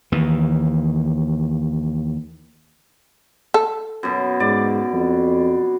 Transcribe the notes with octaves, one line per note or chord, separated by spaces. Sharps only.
D#2 E3
A4
F#2 B2
G#2 D5
F2